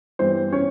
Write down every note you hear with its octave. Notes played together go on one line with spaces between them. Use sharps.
G2 E3 G3 B3 C4 C5
C#4 C#5